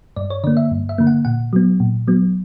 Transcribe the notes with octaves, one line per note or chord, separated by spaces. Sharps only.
G2 D5
C#5
D3 A#3 D5
E5
G2
E5
D3 A#3
F#5
A#2 F#5
F#3 B3
A#2
F#3 B3